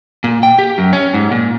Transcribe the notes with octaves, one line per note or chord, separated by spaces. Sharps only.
A#2
G5
G4
F#2
C#4
G#2
A#2